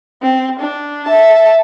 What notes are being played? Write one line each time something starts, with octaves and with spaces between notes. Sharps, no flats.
C4
D4
E5 A5